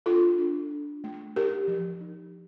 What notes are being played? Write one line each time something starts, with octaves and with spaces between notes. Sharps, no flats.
D4 F4 A4
D4
D4
A3
D#4 G4 A#4
F3
D#4